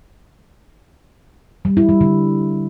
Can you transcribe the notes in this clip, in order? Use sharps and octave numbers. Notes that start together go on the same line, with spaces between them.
G3
E4
G3
D3